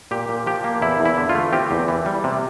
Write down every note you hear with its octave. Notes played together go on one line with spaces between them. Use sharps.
A#2 G4
A#2
F3 G4
A#3
E2 E4
E2
E4
D3
F4
A3
C4 G4
E2
E3
G3
C3